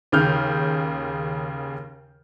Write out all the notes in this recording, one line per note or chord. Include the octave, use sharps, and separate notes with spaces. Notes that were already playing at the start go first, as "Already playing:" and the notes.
D#2 C#3 F6 G6